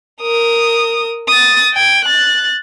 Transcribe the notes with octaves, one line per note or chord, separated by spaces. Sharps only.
A#4 D#6
D#6 A6
G5 G#6
F#6 A6